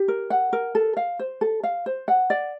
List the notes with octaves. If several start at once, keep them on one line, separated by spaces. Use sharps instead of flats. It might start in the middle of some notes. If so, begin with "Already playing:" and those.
Already playing: G4
A#4
F#5
A#4
A4
F5
C5
A4
F5
C5
F#5
D5